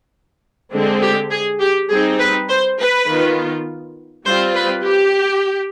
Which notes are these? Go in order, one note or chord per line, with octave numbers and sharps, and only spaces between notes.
D3 G#3 C4
G4
G#4
G4
G3 C4 D#4 G#4
B4
C5
B4
D#3 B3 F4
G3 C4 F4 C5
B4
G4